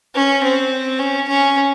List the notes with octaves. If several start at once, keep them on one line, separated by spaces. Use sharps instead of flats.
C#4
C4
C#4
C#4